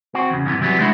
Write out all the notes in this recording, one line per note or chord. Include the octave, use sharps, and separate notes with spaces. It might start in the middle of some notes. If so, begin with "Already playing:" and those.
C4 F#4
E2 C#3
G2 C3 E3 B3
C3 E3 F#3 G3 B3
G#3 A3 D4 E4 F#4